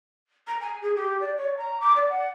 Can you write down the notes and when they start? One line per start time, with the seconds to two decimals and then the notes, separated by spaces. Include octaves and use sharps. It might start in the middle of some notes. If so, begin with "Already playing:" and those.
0.47 A#5
0.60 G#5
0.81 G#4
0.95 G4
1.20 D5
1.36 C#5
1.57 A#5
1.80 D6
1.96 D5
2.09 F#5